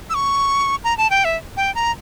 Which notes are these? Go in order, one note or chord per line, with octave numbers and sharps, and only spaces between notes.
E6
C#6
A#5
A5
G5
E5
G5
A#5